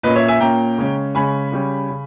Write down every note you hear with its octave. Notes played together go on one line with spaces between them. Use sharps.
A#2 A#3 C#4 B4 D#5
C#5 E5
E5 G#5
A#2 A#3 C#4 G5 A#5
C#3 G#3 C#4
C#3 G#3 C#4 G#5 B5
C#3 G3 C#4
C#3